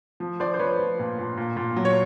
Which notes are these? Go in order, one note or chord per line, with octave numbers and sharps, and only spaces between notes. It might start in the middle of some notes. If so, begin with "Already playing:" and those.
F3
F3 C5 D5
C5
F3 B4 C#5
F3
A#2
A#2
A#2
A#2
F#3
C#5